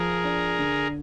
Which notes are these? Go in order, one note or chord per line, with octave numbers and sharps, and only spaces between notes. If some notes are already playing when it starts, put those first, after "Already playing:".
Already playing: F3 G#4 A#4
D4
D3